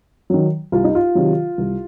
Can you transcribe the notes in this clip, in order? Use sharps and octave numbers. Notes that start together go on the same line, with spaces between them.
D#3 F#3
C2 F4
D#4
F4
C3 D#3 F#3
C2